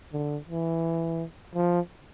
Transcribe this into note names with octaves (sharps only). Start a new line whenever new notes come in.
D3
E3
F3